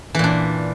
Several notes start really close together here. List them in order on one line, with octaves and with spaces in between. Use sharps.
E3 A#2 D4